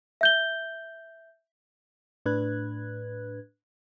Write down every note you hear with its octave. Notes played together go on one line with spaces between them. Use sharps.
E5 G6 G7
A2 D4 B4 F#6 G#6